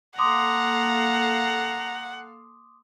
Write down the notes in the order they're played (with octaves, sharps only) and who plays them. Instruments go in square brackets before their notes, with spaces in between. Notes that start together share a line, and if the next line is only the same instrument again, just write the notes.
[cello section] A#3 A4 F5 [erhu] F#5 [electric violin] A#5 [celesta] C6 D6 D#6